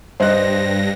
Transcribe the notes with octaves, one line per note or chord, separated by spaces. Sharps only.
G2 C5 D#5 F#6 A#6